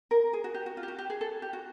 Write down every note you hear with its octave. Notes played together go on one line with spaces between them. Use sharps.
A#4
G#4
F#4
G4
F#4
F4
G4
F#4
G4
G#4
A4
G4
F#4